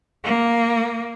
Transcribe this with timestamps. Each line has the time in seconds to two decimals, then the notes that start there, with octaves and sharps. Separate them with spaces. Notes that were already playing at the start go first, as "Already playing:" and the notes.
0.24 A#3